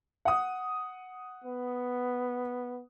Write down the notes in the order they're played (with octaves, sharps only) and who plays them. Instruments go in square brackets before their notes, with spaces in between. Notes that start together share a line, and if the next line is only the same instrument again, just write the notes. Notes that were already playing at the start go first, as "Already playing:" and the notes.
[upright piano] F#5 D#6
[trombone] B3